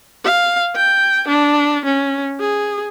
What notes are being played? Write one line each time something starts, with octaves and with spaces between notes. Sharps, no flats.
F5
G5
D4
C#4
G#4